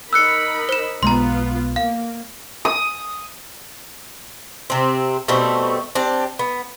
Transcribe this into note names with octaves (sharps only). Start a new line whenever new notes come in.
D#4 A#4 B5 E6 F#6 C#7
C5 E7
B1 G#3 B3 F4 A#5 C6
A#3 F5
D#6
C3 C4
B2 G3 A3 C4
C4 D4 G4
B3